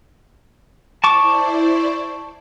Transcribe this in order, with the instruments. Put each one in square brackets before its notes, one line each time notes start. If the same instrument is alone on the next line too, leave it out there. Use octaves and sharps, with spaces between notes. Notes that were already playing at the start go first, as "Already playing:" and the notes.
[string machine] E4 C5 D5 [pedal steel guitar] A5 C#6 D6